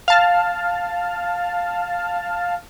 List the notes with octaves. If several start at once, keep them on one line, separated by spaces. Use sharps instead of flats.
F5 A5 F6